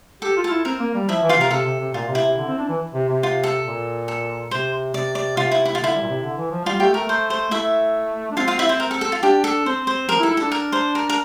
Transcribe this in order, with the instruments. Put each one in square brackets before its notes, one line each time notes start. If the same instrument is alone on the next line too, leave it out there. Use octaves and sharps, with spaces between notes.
[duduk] G4 [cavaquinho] A4
[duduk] F4
[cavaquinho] A4
[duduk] E4
[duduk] C4 [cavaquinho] A#4
[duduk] A#3
G3
[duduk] F3 [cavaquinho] E4 E5
[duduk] E3
[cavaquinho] F4 F5
[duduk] C3 [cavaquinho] A#4
[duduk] C3 [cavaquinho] A4
[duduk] C3
C3
[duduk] A#2 [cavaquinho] F4
[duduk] C3
[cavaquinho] E4
[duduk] C3
D3
C4
D4
E3
C3
C3
[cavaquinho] F4
A4
[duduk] A#2
[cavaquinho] A4
[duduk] C3 [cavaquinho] C5
[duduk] C3 [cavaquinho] D5
[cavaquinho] D5
[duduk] C3 [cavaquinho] F4
[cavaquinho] E4
E4
F4
[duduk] D3 [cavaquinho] E4
[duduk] G3
A#2
C3
D3
E3
F3
[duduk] G3 [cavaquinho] F4
[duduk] A3 [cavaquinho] G4
[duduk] A3 [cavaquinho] A#4
[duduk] A3 [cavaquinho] C5
[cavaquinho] C5
[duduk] A3 [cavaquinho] E4 E5
[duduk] D4
[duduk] C4 [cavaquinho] F4 F5
[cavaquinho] F4 F5
E4 E5
C5
A#4
A4
A4
F4
[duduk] D4 [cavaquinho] G4
[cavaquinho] A4
[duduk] C4 [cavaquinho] C5
[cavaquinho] C5
[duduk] F3 [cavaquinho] A#4
[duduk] E4
[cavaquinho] A4
[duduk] E4
[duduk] D4 [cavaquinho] A4
[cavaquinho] A#4
C5
A#4
A#4